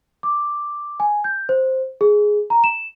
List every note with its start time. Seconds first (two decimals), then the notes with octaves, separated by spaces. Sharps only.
0.23 D6
1.00 G#5
1.24 G6
1.49 C5
2.01 G#4
2.50 A#5
2.64 E7